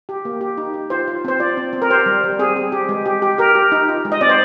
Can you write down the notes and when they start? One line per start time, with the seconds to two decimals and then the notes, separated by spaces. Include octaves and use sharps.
0.09 G4
0.25 A#3
0.41 G4
0.57 D#4
0.74 G4
0.90 F4 C5
1.08 F4
1.24 C4 C5
1.40 F4 D5
1.57 C4
1.73 C4
1.82 A#4
1.90 G4 C5
2.06 G3
2.24 G3
2.39 C4 G#4
2.56 C4
2.72 G4
2.89 G#3
3.06 G4
3.22 G4
3.38 G4 A#4
3.55 G4
3.72 D#4
3.89 F4
4.05 G#3
4.12 D#5
4.21 C4 D5
4.29 C5